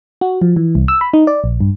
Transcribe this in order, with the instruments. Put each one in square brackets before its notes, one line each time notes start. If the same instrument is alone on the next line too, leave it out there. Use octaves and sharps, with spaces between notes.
[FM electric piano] F#4
F3
E3
C2
E6
B5
D#4
D5
A#1
G2